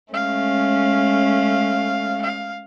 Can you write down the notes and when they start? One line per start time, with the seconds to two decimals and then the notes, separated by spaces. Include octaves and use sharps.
0.13 G#3 A3 C#4 F5
2.22 F5